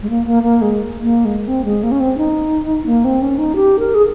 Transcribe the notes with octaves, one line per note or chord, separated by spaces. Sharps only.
G#3
A#3
A#3
A#3
G#3
A#3
G#3
C4
G#3
A#3
C#4
C4
D#4
A#3
C4
C#4
D#4
G4
A#4
G#4